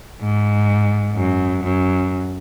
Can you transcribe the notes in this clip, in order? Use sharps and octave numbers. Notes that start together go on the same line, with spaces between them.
G#2
F#2
F#2